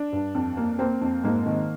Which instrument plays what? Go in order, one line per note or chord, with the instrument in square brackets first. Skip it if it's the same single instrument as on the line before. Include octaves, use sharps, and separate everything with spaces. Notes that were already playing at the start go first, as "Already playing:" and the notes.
Already playing: [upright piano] D4
G2
F2
A#3
A#3 C4
F2
G#2 A#3
D#3